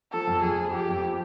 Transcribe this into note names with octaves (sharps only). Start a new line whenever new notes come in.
F3 A4
F2
F2 G#4
F3
F3 G4
F2
F3